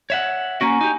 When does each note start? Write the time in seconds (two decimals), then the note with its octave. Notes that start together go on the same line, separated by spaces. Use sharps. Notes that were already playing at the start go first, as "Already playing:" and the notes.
0.10 C#5 E5 F#5
0.61 A#3 C#4 F#4 G#5 A#5 C#6
0.81 D#4 G4